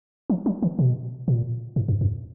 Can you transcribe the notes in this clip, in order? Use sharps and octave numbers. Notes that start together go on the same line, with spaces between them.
F3
F#3
D#3
B2
A#2
G#2
F#2
F2